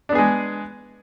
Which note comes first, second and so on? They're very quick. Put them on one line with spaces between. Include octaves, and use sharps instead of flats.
D4 B3 G#4 G#3